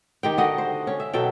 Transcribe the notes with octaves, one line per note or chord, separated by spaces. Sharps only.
D#3 G4 G5
D3 F#4 D#5 F#5
C5
C#4
E5
B2 F#3 A4 G5